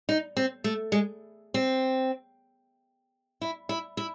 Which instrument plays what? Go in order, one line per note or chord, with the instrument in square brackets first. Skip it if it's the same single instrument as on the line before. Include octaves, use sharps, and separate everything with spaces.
[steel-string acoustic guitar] D#4
C4
A3
G#3
C4
E4
E4
E4